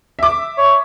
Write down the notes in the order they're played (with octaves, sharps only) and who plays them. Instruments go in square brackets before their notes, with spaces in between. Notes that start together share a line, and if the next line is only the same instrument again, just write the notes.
[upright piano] E5 D6
[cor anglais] C#5